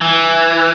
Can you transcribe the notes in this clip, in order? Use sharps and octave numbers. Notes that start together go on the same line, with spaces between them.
E3